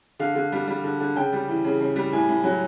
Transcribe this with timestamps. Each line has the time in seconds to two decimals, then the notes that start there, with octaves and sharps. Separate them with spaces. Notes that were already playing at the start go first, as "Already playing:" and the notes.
0.20 D3 F5
0.35 D3
0.52 G3
0.67 G3
0.84 D3
1.00 D3
1.15 C#3 G5
1.33 G3
1.48 E3
1.64 C#3
1.80 C#3
1.96 G3
2.13 A2 G#5
2.29 A2
2.44 F#3